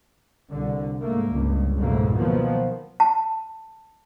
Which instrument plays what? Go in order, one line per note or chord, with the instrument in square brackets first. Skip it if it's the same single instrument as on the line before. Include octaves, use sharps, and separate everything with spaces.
[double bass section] C2 D3
G#2 A3 A#3
G1 C#2
F#1 F2 G#2 B2 A3 A#3
B2 D#3 F3 F#3 A#3 B3
[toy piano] A5